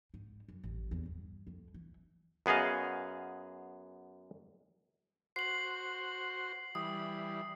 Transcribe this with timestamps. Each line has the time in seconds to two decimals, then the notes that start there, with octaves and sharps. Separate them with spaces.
0.14 G#2
0.48 F#2
0.63 A1
0.91 E2
1.06 G2
1.47 F2
1.74 E3
2.46 F#2 B3 G#4 D#5 F5
5.36 F#4 C5 C7 F#7
6.75 E3 G3 D#6